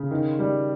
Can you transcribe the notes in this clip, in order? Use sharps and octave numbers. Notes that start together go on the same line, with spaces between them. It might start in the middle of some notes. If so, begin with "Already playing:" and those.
Already playing: C#3
D#3
G3